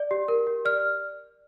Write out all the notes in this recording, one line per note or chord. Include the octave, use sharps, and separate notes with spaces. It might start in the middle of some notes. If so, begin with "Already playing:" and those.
Already playing: D5
G4
A#4
G4
D5 F6